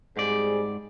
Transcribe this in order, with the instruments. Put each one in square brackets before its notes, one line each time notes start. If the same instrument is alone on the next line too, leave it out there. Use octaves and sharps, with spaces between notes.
[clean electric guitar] G#2 D5 [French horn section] G3 C4 G#4